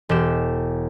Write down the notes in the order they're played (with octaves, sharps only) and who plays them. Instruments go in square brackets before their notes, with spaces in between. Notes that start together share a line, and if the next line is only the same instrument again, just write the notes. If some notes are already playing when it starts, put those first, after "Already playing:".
[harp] E1 G4 E7